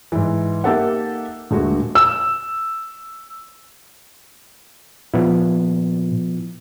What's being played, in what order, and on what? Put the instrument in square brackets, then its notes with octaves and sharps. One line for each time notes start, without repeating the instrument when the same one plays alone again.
[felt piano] G#2 E3
A#3 D#4 G4 A4 E5 F#5
D#1 D3 G#3 A3 F#4
E6
[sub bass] A#2 [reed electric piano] F3 B3 E4